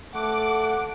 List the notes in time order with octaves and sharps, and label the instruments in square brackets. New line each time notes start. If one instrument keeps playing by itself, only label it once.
[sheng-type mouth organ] A3 [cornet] F#5 [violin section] D6 D7